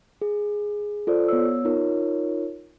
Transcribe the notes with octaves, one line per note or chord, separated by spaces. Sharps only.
G#4
F4 A4 C5 D5
B3 C#5 E6
D#4 F4 A#4 C#5